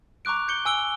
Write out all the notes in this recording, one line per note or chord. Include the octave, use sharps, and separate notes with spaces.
A#5 C#6 D6 F#6 D7
G6 C#7 G7
G#5 E6 D7 G7